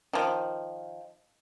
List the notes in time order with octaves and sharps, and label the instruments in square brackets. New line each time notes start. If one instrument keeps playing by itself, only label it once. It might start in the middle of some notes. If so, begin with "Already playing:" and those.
[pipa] D#3 F3